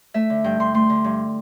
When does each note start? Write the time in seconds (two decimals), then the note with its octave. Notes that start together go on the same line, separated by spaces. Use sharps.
0.14 A3 E5
0.30 D3
0.44 G2 G5
0.60 G2 C6
0.74 A3 C6
0.90 D3
1.04 G2